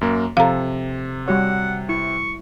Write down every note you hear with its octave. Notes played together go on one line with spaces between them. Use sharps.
F#2 A#3
C3 F3 A4 F5 A#5
G3 F#4 C#5 F#5
E4 C#6